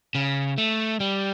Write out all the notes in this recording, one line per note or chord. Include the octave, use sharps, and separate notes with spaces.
C#3
A3
G3